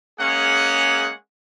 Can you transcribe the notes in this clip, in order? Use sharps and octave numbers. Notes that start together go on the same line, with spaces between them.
G#3 A#3 C#4 G#4 F#5